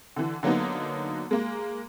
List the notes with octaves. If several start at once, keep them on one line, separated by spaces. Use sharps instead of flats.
D3 E3
D3 F#3 A#3 B3 D#4
G#3 A#3